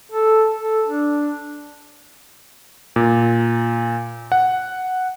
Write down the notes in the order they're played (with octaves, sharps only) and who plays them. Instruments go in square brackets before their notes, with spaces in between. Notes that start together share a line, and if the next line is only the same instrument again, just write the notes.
[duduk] A4
A4
D4
[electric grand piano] A#2
F#5